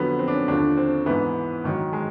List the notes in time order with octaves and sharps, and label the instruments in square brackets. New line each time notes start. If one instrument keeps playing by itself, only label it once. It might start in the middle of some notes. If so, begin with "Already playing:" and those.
Already playing: [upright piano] F2 D3 F#3 B3
C4
D4
C#4
D#2 D3 F3 D4
C4
G#2 E3 B3
G#2 D#3 F#3
G#3